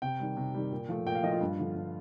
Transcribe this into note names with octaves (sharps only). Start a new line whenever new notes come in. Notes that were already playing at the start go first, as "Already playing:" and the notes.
C3 G5
D#3 G3
C3
D#3 G3
A#2
F3 A3
A#2 G5
F5
F3 A3 D#5
F4
G2
D3 F3
G2